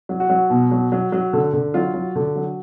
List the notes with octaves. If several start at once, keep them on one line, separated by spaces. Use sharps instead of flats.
F#3
F#4
F#3
B2
F#3
F#3
F#3
D3
D3
F#3 F4
F#3
D3
F#3